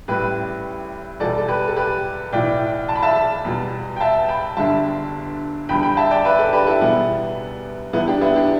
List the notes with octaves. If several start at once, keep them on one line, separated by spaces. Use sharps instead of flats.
A1 A2 G3 G4 B4
E2 B2 G3 A4 D5
A4
G4 B4
A4
G4 B4
B1 A2 E3 D5 G5
A5
B5
E5 A5
E2 B2 G3
G5
E5 A5
G5 B5
G1 G2 D3 G3 E5 A5
E2 D3 G3 G5 B5
G5 B5
E5 A5
D5 G5
B4 E5
A4 D5
G4 B4
E4 A4
E1 E2 B2 G3 B3 E4
E2 E3 G3 B3 E4
D4 G4
B3 E4
D4 G4